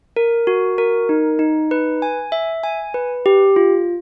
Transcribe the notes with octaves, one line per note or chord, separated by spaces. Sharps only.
A#4
F#4
A#4
D#4
D#4
B4
G#5
E5
G#5
B4
G4
F4